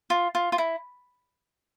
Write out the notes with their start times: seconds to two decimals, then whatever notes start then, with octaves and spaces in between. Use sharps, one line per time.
0.10 F4
0.35 F4
0.52 F4
0.58 E4